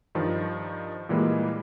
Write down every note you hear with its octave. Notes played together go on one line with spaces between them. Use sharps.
G2 D#3 F3
A#2 E3 G3 G#3 A#3